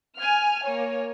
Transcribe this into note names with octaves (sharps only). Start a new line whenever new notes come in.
G#5 F6
A#3 C#5